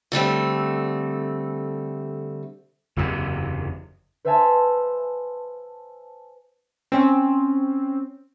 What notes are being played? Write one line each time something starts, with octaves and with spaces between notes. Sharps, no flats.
D3 G3 A3 C4
F#1 E2 A2 C3
B4 C5 E5 F5 G#5 A5
C4 C#4